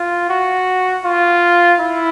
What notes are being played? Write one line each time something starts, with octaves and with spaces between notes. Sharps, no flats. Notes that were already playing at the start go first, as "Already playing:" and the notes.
Already playing: F4
F#4
F4
E4